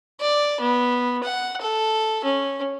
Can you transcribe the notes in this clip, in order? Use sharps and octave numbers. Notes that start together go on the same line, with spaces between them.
D5
B3
F#5
A4
C#4